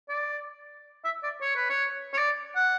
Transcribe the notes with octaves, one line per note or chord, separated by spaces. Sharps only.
D5
E5
D5
C#5
B4
C#5
C#5
D5
F#5